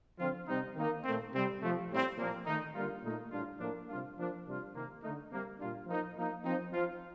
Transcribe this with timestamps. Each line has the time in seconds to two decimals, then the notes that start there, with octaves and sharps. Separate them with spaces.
0.19 D3 F3 C4 F4
0.48 C3 G3 C4 D#4
0.76 D#3 A#3 D#4
1.04 A#2 A3 C4
1.33 C3 G3 C4
1.61 C3 F3 A3
1.90 A2 G3 C4
2.17 A#2 F3 A#3
2.46 D#3 A3 D#4
2.75 D3 G3 A#3 F4
3.03 A#2 A3 D#4
3.31 A2 G3 D4 F4
3.60 A2 F3 A#3 D4
3.88 C3 G3 D4 F4
4.17 F3 A#3 D4
4.46 C3 G3 D4 F4
4.73 C3 D#3 A#3
5.02 D3 A3 D#4
5.31 C3 G3 A#3
5.59 A#2 G3 D4 F4
5.86 F3 A#3 D#4
6.16 F3 A#3 D#4
6.44 F3 C4 D#4
6.72 F3 C4 F4